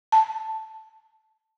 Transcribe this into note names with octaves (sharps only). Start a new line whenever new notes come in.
A5